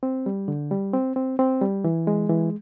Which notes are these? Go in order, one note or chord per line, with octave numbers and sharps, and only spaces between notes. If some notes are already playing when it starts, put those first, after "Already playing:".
C4
G3
D3
G3
C4
C4
C4
G3
E3
G#3
E3